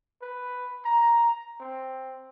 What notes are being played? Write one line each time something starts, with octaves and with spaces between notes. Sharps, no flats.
B4
A#5
C4